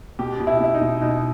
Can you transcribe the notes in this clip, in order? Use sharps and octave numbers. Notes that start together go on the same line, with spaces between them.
B2 G4
B2
E4
B2 E4
D#4
B2
B2 D#4